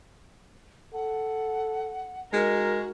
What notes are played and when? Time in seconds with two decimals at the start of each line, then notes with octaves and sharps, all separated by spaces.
0.93 A4 F#5
2.33 G#3 D#4 F#4 A#4